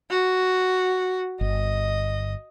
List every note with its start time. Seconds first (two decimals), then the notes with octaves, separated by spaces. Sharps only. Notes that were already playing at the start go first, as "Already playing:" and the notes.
0.10 F#4
1.41 G1 D#5